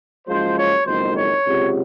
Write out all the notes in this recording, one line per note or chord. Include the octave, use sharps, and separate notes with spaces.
F#1 F#2 F3 G#3 C5
C#5
F#1 F2 D#3 G#3 C5
C#5
C#2 C3 F#3